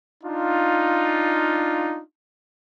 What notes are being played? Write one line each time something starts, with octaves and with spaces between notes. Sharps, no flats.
D4 D#4 F4